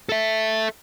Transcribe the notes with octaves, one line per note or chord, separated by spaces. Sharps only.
A4 E5